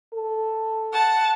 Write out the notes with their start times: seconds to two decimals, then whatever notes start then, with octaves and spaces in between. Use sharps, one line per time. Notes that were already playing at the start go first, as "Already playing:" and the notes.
0.13 A4
0.93 F#5 A5